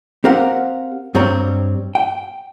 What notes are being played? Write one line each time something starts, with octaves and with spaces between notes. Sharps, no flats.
C4 G4 A#4 F5 F#5
G2 G3 C4 C#5 A#5
G5